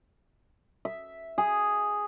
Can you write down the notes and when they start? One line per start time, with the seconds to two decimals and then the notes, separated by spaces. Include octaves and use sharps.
0.85 E5
1.38 G#4